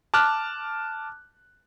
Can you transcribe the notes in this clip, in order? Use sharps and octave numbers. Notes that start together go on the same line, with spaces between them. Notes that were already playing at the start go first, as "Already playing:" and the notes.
A5 D6 F6 F#6